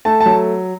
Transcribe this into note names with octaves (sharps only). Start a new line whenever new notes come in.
A3 A5
A5
F#3